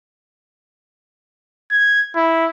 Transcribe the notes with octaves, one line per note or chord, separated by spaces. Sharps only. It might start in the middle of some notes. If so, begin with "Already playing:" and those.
G#6
E4